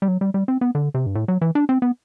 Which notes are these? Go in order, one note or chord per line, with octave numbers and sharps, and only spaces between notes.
G3
F#3
G3
G3
C4
B3
D3
C3
G2
A2
F#3
E3
D4
C4
B3